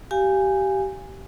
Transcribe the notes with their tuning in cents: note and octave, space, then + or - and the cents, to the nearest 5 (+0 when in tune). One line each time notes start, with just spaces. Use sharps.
G4 -20 F5 +0 G#5 -15